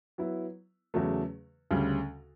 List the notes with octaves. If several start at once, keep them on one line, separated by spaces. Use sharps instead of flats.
F#3 B3 E4
E2 C#3 F#3 A3
D2 C#3 G3